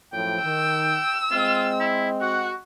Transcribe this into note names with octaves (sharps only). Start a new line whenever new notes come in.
F#2 A2 F3 G5
D#3 E6
G#3 C4 F4 D#5
E4
F#4 F#5